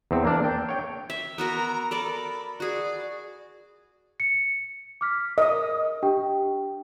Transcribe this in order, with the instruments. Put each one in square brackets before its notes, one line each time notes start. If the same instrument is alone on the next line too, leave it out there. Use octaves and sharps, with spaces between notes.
[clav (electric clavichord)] E2 C4
A#3 D4 D5
G5
C#5 G5
[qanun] E5
[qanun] B3 F#4 A#4 [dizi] A#5
[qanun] A4 A#4 D5 [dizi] B5
[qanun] F#4 G#4 [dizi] D5
[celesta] C#7
D6 F6 B6
[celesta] A#4 [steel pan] D#5 D#6
[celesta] D4 G4 G5